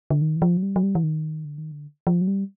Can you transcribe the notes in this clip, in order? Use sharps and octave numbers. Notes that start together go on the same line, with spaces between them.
D3
D#3
E3
F3
F#3
G3
F#3
G3
E3
D#3
D3
D#3
D3
F3
F#3
G3